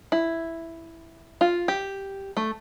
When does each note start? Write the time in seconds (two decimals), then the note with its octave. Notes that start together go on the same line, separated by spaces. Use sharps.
0.12 E4
1.41 F4
1.68 G4
2.37 A3